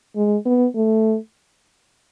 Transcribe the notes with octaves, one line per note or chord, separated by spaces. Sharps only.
G#3
B3
A3